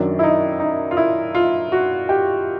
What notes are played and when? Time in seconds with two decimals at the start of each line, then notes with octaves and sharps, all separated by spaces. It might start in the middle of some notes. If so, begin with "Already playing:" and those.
Already playing: F#2 D#3 F#3 D4
0.19 E4
0.23 D#4
0.60 D#4
0.91 F4
0.97 E4
1.35 F4
1.72 F#4
2.09 G4